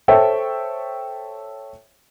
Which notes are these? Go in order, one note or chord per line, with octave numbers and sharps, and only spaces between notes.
A4 C5 C#5 E5 G5